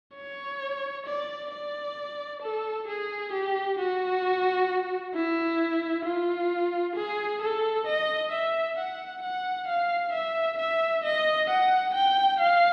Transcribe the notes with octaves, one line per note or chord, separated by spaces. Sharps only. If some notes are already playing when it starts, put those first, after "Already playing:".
C#5
D5
D5
A4
G#4
G4
F#4
E4
F4
G#4
A4
D#5
E5
F#5
F#5
F5
E5
E5
D#5
F#5
G5
F5